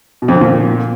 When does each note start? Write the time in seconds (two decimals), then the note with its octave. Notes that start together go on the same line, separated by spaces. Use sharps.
0.22 B2
0.28 F2
0.35 D3
0.41 A#2